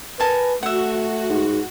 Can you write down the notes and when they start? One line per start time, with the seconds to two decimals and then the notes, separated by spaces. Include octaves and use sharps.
0.20 A#4 B4 G#5 A5
0.63 A3 F#4 E5 F#5
1.30 G#2